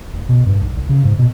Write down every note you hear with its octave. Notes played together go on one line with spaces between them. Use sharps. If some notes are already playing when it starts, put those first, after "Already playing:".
F1
B2
G2
B1
C2
C#3
G#2
B2